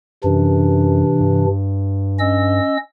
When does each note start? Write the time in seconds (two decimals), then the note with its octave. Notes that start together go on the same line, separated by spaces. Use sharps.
0.24 F#2 C3 E3 D4
1.20 G2
2.19 C#4 D#5 E6